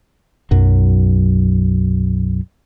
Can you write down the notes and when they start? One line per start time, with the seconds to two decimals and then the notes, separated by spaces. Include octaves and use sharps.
0.51 B1 F#2 F#3